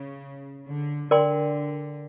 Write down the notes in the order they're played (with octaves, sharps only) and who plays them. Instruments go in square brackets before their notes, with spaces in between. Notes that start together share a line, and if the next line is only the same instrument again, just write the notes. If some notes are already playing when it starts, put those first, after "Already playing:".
Already playing: [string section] C#3
D3
[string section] D3 [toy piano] A#4 D5 G5 C6